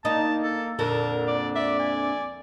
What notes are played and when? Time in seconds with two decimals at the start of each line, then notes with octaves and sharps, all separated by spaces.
0.05 A#3 D#4 A5
0.44 A4
0.79 F2 A#2 D3 A#4 A5
1.27 D5
1.55 D5 E5
1.79 G#5